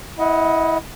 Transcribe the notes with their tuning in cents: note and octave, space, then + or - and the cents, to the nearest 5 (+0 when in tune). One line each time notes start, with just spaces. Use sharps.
E4 -15 D#5 +15 F#5 +0